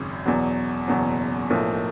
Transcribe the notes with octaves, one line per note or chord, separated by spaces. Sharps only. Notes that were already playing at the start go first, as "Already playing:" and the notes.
Already playing: G#1 F#2 C#3
E2 B2 F#3
F#1 E2 B2 F#3
B1 A2 F3 A#3